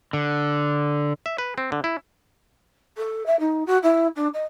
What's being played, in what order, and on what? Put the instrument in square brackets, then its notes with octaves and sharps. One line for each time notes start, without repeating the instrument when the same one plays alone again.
[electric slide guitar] D3
[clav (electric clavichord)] E5
B4
C4
D3
E4
[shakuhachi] A4
E5
D#4
F#4
E4
D4
D#5